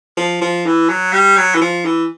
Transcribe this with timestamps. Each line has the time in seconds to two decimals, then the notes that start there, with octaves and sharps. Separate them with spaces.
0.17 F3
0.42 F3
0.66 E3
0.89 F#3
1.13 G3
1.37 F#3
1.55 E3
1.61 F3
1.85 E3